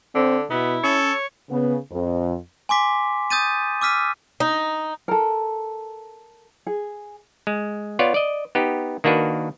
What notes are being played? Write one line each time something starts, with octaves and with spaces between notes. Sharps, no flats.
D3 C4
B2 B3 E4
C#4 A4 C#5
C#3 B3
F2
G#5 C6 D6 B6
D#6 G6 A6 D#7
D6 E6 F6 B6 D#7
D#4
A4 A#4
G#4
G#3
B3 F4 C#5 D5
D5 D#5
B3 D#4 G4
D#3 A#3 D4 F#4 B4